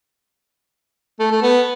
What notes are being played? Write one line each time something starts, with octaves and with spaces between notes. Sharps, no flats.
A3
A3
B3